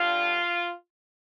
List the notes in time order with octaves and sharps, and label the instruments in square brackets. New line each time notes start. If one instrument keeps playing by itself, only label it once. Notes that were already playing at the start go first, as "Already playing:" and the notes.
Already playing: [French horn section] G2 D3 G3 F4